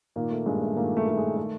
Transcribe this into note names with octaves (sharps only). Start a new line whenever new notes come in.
A#2 D#3 A#3
A3
G2 G#3
A3
A#2 D#3 A#3
A3
D#3 A3
G#3
A3